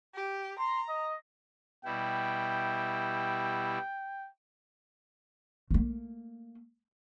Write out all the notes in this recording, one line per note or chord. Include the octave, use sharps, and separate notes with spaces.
G4
A#5 C6
D#5
B2 G3 E4 G5
A3 A#3